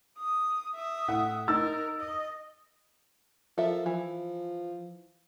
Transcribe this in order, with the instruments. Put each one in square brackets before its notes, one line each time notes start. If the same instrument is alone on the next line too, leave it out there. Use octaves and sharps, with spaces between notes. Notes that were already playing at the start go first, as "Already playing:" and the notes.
[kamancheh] D#6
E5 D#6
[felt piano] A2 F#5
[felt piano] D#4 E6 A6 [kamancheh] A#4
[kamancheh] D#5
[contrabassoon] F3 [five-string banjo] A4 A#4 E5
[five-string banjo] E3 [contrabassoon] F3